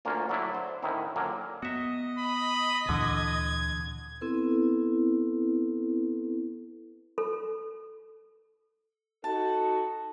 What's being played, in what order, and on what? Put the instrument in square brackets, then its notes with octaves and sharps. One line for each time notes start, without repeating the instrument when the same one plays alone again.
[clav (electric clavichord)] D2 D3 A#3 C#4 F4
F#3 A3 D4 E4
F#4 C5
A2 D3 D#3 C#4 D#4 E4
D3 F3 F#3 A#3 C#4
[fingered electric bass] B3 [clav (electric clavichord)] F#4 E5 [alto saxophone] D#5
[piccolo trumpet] B5
[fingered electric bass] D2 A#2 E3 [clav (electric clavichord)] D3 [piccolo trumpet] G#6
[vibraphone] B3 C4 E4 A4 B4
[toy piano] A4
[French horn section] D#4 F#4 A4 [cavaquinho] A5